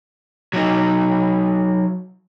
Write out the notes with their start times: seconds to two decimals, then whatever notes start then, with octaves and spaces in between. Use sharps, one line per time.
0.53 F#3 D#4